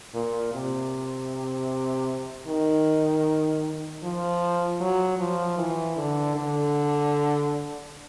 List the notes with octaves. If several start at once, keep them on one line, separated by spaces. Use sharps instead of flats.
A#2
C3
D#3
F3
F#3
F3
E3
D3
D3